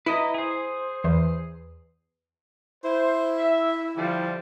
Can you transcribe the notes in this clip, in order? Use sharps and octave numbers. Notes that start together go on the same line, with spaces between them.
E4 B4 D#5 A#5
G#4 C5
E2
E4 C5
E5
D3 F3 G3